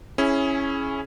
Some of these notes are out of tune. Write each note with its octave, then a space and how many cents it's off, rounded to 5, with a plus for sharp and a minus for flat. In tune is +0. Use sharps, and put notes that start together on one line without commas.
C#4 -10 E4 +0 G#4 +20